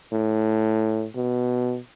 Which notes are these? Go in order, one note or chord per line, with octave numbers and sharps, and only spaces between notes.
A2
B2